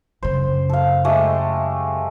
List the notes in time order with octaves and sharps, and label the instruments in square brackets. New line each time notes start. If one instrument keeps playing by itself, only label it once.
[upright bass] F#2 C#3 [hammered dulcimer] C5
[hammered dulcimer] A4 F5
G#3 A3 G4